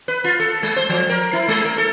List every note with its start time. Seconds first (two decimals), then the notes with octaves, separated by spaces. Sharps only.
0.08 B4
0.24 F4
0.40 A4
0.63 G#3
0.76 C5
0.90 F3
1.10 A#4
1.33 E4
1.48 G#3
1.65 A#4
1.78 A4